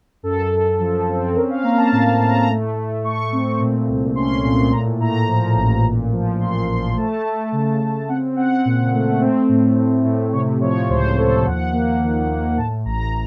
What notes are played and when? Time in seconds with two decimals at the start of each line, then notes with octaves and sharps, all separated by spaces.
0.23 F#2 A4
0.51 F#2
0.80 F3
1.07 C4
1.36 C#4 A#4
1.50 F5
1.63 A#3 A#5
1.77 A5
1.91 A2 F5
2.11 A5
2.19 A2
2.29 A#5
2.48 A3
2.75 A3
3.03 A3 C#6
3.32 C4
3.59 A#2
3.88 C2
4.15 C#4 C6
4.44 A#2 C6
4.72 A2 A#5
5.00 A2 A#5
5.28 F3
5.56 A1
5.84 A#2
6.12 F3
6.40 A#2 C6
6.68 F3 C6
6.96 A3 A5
7.25 A3
7.52 C#3
7.81 C#3
8.09 C4 F#5
8.36 C4 F#5
8.65 A#2
8.92 A3
9.21 C4
9.49 A2
9.77 A2
10.04 A2
10.33 C3 C#5
10.61 F3 C#5
10.89 C#2 C5
11.17 F3 A4
11.45 D#2 F#5
11.73 A#3
12.01 D#3
12.29 A#3
12.57 A2 A5
12.85 A1 A#5